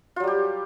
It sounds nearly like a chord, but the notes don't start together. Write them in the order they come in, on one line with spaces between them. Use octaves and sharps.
F4 F#3 G3 G4